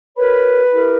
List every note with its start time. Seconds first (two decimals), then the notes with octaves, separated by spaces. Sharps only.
0.16 F#4 A#4 B4 C#5 B5
0.72 E4 G4 A#4